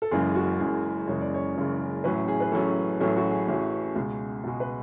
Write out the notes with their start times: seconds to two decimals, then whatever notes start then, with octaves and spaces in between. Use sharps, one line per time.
0.02 A4
0.11 F#1 F#2 C#3 E3 G#3 G#4
0.35 F#4
0.59 F#1 F#2 C#3 E3 G#3 G#4
1.08 F#1 F#2 C#3 E3 G#3 C#5
1.21 D5
1.34 C#5
1.57 F#1 F#2 C#3 E3 G#3
2.04 A1 A2 F#3 C#4 B4
2.28 G#4
2.40 B4
2.52 A1 A2 F#3 C#4 A4
3.00 A1 A2 F#3 C#4 A4
3.17 F#4
3.31 G#4
3.48 A1 A2 F#3 C#4
3.96 C#2 B2 G#3
4.44 C#2 B2 G#3
4.60 B4